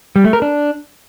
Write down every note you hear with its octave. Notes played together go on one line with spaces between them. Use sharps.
G3
A3
A#4
D4